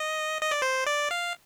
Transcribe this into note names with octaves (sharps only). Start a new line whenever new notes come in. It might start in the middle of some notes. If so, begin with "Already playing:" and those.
Already playing: D#5
D#5
D5
C5
D5
F5